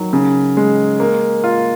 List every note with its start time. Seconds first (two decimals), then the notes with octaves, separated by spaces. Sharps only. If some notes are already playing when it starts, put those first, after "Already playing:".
Already playing: D#3 F#3
0.13 C#3
0.57 G#3
1.00 A#3
1.44 F4